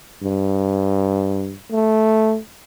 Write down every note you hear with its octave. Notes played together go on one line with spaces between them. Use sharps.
G2
A3